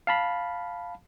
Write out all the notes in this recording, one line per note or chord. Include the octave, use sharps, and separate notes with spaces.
F5 A5 B5